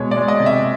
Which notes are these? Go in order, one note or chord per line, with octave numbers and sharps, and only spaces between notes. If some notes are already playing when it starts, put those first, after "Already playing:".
Already playing: B2 G#3 C#5
D5
G#3
D#5
C3
E5